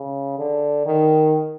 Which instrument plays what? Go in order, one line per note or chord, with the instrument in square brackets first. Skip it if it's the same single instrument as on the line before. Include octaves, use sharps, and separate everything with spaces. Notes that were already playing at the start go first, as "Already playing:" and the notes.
Already playing: [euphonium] C#3
D3
D#3